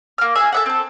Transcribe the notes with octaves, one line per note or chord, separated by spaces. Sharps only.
A#3 F6
G#4 E5 G#5
A4 E5 F#5
C4 A4